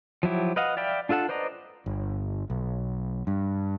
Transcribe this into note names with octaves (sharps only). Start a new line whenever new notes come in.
F3 F#3 E4 G4
B4 D#5 F5 F#5
D5 E5 F5 G5 B5
D4 F4 A4 F#5 A5
B4 C5 D5 D#5 A#5
G1
B1
G2